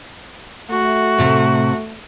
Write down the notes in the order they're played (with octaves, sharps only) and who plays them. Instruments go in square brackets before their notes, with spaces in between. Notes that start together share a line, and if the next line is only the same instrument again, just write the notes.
[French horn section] A3 [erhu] F#4
[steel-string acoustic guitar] A2 C3